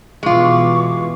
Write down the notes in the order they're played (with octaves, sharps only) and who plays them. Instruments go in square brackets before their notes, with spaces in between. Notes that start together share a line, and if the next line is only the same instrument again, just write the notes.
[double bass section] B2 E3 [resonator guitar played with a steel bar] G#3 F4 [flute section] C#6 D6